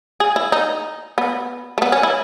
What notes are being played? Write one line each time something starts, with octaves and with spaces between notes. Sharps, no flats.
G#4
E4
D#4
B3
A3
B3
C#4
E4